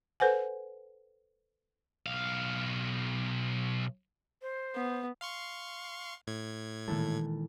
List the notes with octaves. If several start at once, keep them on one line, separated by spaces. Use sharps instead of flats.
A4 B4 C5 F#5 G#5
B1 F5
C5
B3
F5 C6 C#6
A2 G#6
A#2 D#3 E3 G#3 A4